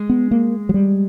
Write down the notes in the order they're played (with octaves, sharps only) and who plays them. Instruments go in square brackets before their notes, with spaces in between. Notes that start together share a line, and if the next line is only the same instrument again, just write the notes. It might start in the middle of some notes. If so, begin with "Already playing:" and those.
Already playing: [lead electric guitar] G#3
[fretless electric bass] B3
A#3
F#3
G3